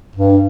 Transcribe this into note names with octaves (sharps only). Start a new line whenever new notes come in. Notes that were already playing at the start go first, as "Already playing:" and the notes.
G2